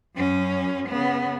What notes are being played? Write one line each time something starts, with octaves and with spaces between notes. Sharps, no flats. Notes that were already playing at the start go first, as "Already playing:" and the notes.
F#2 C#4
C#3 B3